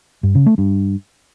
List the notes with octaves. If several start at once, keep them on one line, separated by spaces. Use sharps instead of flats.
G2
C#3
A3
G2